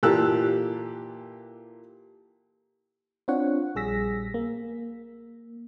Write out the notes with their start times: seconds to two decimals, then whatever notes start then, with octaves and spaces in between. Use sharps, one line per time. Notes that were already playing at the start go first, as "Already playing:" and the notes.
0.03 A#2 E3 G4 A4 E6 F#6
3.28 C4 D4 F4 C#5 F#5
3.75 A#1 G3 G#4 E6 A#6 B6
4.34 A#3